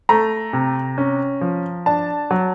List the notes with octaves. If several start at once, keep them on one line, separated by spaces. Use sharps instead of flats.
A3 A#5
C3
C#4
F3
D4 A5
F#3